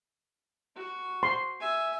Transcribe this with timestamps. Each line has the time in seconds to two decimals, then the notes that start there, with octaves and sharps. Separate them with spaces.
0.76 F#4
1.23 C6
1.60 E5 G#5